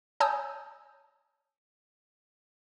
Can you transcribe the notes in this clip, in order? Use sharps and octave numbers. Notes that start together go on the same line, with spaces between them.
C#5 G#5 A5 D#6 E6 G6